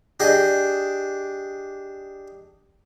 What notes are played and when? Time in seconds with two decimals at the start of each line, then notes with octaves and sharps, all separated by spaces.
0.20 D4 G4 G#4 D#5